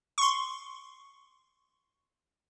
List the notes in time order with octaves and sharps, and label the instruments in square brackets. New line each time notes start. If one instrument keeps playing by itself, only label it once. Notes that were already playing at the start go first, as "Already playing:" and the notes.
[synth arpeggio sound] C6 C#6